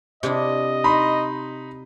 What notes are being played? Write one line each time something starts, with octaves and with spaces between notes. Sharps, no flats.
C3 D4 E4 D#5
D#4 B5 C6